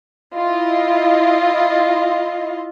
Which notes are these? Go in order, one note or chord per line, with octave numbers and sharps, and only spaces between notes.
E4 F4 D#5